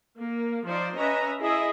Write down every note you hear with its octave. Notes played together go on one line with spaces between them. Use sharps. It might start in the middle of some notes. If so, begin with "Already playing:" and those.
A#3
F3 D#4 C5 D5
C#4 B4 D#5 E5 A#5
E4 G#4 D#5 E5